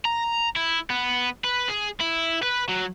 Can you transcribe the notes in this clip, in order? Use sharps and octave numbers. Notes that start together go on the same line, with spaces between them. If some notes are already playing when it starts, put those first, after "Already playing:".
A#5
E4
B3
B4
G#4
E4
B4
F#3